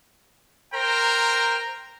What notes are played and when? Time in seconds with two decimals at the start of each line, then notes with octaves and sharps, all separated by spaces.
0.74 A#4 C5 G5 A#5